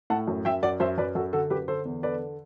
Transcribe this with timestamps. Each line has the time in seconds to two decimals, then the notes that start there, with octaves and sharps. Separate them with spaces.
0.10 A2 F#5 A5
0.27 F#2
0.45 F#2 E5 G5
0.63 F#2 D5 F#5
0.80 F#2 C5 E5
0.98 F#2 B4 D5
1.15 F#2 F#4 A4
1.33 D3 F#4 A4
1.50 F#2 G4 B4
1.68 D3 A4 C5
1.85 E2
2.03 D3 B4 D5